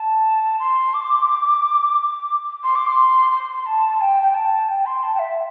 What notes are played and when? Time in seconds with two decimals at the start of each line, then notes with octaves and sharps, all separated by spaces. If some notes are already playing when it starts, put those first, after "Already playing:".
Already playing: A5
0.59 C6
0.94 D6
2.64 C6
2.76 D6
2.87 C6
3.32 C6
3.57 C6
3.66 A5
3.89 A5
4.01 G5
4.23 G5
4.34 A5
4.69 G5
4.86 C6
5.03 A5
5.15 G5
5.19 E5